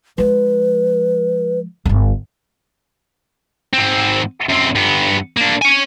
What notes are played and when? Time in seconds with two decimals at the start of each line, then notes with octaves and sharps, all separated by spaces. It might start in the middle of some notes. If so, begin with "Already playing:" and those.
0.18 F3 G#3 B4
1.86 D1 G1
3.73 G#2 C4
4.49 F#2 C4
4.75 G2 B3
5.37 A#3 D4
5.62 C#5 G#5